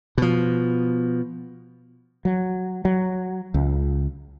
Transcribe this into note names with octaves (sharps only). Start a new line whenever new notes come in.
B2 F3
F#3
F#3
C#2